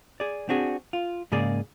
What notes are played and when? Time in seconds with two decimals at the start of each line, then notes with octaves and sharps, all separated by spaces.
0.20 G#4 D5
0.49 C4 D4 F#4 G#4
0.93 F4
1.32 G#2 C#3 A#3 G#4 D5